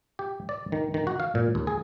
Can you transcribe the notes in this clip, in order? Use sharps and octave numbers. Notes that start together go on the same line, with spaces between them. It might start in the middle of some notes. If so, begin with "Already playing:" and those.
G4
D5
D#3
D#3
F#4
F5
A#2
D#2
G#4